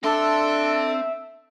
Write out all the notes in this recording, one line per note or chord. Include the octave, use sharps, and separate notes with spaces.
C4 D4 A4 E5 C6